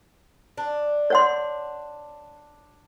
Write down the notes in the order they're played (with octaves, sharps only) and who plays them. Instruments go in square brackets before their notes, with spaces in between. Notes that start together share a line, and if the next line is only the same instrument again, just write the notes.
[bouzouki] D4
[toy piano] C#5 F#5 C6